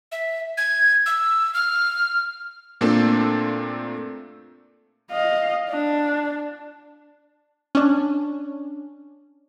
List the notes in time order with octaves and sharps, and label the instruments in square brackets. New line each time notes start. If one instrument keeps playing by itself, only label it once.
[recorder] E5
G#6
E6
F6
[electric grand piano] A#2 A3 A#3 C4 D4 A4
[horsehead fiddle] D#5 F5
D4
[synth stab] C#4 D4